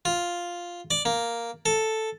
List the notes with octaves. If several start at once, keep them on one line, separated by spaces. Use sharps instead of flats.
F4
D5
A#3
A4